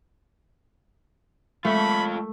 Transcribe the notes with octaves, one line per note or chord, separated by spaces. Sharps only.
G#3 A3 F4 A4 E5 B5